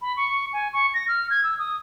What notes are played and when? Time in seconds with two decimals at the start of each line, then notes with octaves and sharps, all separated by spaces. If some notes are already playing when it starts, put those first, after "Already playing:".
0.02 B5
0.17 C#6
0.53 G#5
0.73 C#6
0.94 A#6
1.08 F6
1.30 G#6
1.43 E6
1.59 D#6